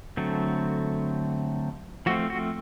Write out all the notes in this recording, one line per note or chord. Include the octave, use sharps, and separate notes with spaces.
D3 F#3 A3 C4
F3 A3 C4 F#4
F#4